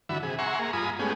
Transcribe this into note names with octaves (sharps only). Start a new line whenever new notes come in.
G2 D3 E3 F#4 E5 B5
C3 G#4
E5 F#5 G#5 A#5 C6 C#6
A#3 G#4 A#5
G2 F4 G#5 A#5 B5 D#6
G#3 A3 B3 C#4 G4 G#4